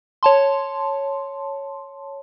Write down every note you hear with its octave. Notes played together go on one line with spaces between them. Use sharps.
C#5 A5 C6